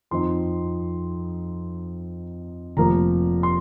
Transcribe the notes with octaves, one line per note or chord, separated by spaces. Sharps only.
F2 F3 C4 D#4 C6
F1 F2 F3 A#3 A#5
C6